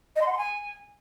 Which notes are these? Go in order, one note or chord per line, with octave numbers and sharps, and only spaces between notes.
D#5
C6
F#5
C6
G#5